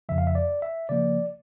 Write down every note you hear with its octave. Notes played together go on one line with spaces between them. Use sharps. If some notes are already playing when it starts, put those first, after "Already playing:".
F2 C#3 F3 E5
F5
E5
D5
E5
C#3 F3 A#3 D5